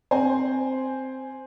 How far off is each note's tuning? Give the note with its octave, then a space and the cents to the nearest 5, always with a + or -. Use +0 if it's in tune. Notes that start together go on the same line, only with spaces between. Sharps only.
C4 +0 C5 +0 G#5 +0